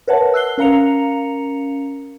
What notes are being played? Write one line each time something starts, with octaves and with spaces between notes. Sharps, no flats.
A#4 B4 C#5 E5 F#5 A5
E6 F#6 C7 G7
C#4 A#4 F5 A#5 C#7 F7